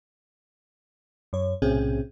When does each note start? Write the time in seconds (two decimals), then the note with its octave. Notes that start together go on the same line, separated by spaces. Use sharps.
1.33 F#2 C#5
1.62 B1 A2 C3 C4 C#4 G#4